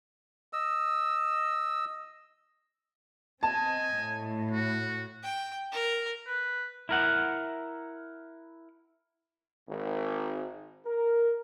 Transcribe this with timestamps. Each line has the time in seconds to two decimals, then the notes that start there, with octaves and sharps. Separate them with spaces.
0.53 D#5 E6
3.43 C4 D#5 G#5 A5
3.98 A2
4.51 F#4
5.24 G5
5.72 A#4
6.27 B4
6.89 E4 A#4 F#5
9.68 G#1
10.86 A#4